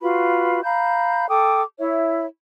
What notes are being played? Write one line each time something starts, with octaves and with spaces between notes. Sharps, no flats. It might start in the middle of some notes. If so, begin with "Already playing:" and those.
F4 F#4 B4 B5
F5 A#5 B5 G6
A4 G5 D6 D#6
E4 C#5 E5